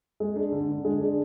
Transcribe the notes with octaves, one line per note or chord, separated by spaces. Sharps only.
G#3
D4
D3
D3
G#3
D4